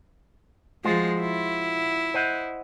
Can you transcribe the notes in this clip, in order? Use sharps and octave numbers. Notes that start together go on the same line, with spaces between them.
F3 G#3 F4 F#4 C5
E4
C5 D#5 F#5